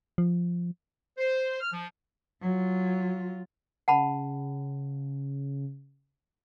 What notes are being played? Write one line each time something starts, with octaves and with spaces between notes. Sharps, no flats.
F3
C5
F6
F3
F#3 F4
C#3 F#5 A5 B5